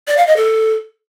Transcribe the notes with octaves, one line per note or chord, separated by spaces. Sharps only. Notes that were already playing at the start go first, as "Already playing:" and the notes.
D5
F5
D#5
A4